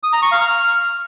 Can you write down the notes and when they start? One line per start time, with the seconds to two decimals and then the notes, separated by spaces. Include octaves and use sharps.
0.03 D#6
0.13 A#5
0.22 C#6
0.32 F5
0.41 F6